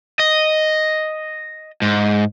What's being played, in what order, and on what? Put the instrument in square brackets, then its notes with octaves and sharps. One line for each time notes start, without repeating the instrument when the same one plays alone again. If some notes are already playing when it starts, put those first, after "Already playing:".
[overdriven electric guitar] D#5
G#2